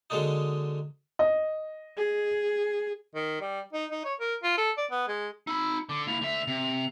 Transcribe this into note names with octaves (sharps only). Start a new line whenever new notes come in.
D3 F#3 G#3 A#3 D4 D#4
D#5
G#4
D#3
G3
D#4
D#4
C#5
A#4
F4
A4
D5
B3
G#3
D#4 B5 E6
D3 D6
A#3 E4 F7
D3 E5
C3